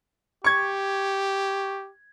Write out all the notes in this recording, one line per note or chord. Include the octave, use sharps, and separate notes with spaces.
G4 C#6 G#6